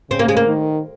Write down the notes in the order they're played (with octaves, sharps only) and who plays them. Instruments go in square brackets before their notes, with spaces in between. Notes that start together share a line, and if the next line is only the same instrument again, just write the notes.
[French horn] C#3 [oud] C4
[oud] A#3
G#3
A#3
[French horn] D#3